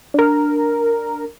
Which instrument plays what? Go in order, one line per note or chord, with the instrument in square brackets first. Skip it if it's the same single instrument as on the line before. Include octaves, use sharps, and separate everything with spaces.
[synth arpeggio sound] D4 A#4